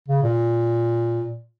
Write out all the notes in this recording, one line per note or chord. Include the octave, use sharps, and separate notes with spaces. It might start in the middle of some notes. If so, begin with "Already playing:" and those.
C#3
A#2